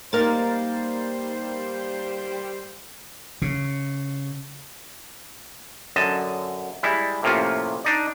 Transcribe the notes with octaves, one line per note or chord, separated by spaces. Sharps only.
G3 A#3 D#4 A#4 C5 A6
C#3
F#2 D3 D#5 A5
G3 G#3 E4
A2 C3 F3 A#3 C#4 F4
D4 D#4 D5